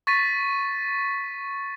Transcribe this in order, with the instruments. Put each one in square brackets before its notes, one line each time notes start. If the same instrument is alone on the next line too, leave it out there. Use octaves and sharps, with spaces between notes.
[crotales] C#6 A6 B6 D#7